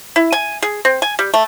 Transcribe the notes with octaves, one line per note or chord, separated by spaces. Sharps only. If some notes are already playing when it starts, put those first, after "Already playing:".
E4
G#5
G#4
C4
G#5
G3
A3